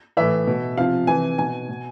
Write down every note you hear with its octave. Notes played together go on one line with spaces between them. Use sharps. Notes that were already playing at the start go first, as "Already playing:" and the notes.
A2 E3 E5
B2
C3 F3 F5
C3 E3 G#5
B2 G#5
B2